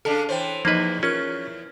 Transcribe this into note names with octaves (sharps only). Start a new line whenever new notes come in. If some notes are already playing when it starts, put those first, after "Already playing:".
C#3 D4 A4 A5
E3 C5 C#5 G5
E2 F3 A#3 D#4 B4 D#5
C#4 F4 A#4 F6